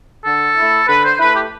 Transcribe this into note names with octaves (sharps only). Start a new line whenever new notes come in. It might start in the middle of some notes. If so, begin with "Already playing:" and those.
D3 A4
A3 E4
D3 B4
C5
A3 E4 B4
G4